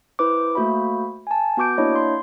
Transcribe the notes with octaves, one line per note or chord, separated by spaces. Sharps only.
E4 B4 C5 D6
A3 A#3 F#4 C5 E5 B5
G#5 A5
B3 F#4 C#6 D6 G6 D7
A#3 D4 E4 C#5 D#5 G6
C6